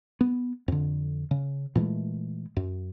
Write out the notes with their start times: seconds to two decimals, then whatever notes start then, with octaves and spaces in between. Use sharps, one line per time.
0.21 B3
0.68 F2 D3
1.31 C#3
1.75 A#2 E3 G#3 A3
2.57 F#2